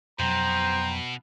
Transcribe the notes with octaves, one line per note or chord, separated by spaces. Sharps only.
F2 B2 F#3 C5 G5 A#5